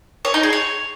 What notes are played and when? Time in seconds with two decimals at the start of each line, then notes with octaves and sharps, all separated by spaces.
0.25 C#5
0.34 D#4
0.43 G#4
0.53 C#5